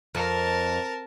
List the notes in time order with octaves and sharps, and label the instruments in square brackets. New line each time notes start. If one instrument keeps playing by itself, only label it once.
[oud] F2 [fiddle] A#4 A5